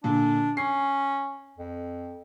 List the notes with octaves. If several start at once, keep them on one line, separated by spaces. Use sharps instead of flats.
A#2 D3 D4
C#4 C7
F2